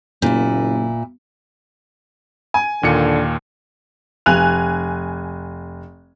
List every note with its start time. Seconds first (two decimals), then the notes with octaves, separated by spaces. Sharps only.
0.22 F#1 A#2 E4
2.54 G#5
2.83 D#2 A#2 D3 C#7
4.26 F1 G#5 F#6 F7